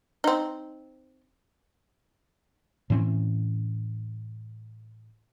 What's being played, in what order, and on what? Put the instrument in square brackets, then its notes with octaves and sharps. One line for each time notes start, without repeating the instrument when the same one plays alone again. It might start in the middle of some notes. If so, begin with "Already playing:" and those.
[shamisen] C4 D#4
[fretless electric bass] A2 E3 C4 C#4